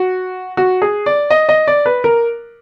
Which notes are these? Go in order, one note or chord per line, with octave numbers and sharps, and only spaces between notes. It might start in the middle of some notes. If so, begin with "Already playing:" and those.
Already playing: F#4
F#4
G#4
D5
D#5
D#5
D5
B4
A#4